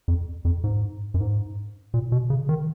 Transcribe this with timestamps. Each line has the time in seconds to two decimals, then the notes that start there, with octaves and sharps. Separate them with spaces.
0.08 F2
0.45 F2
0.64 G#2
1.14 F#2
1.20 G#2
1.94 A#2
2.12 B2
2.30 C#3
2.49 D#3